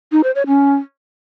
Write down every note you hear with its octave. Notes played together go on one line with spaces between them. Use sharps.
D#4
C5
C#5
C#4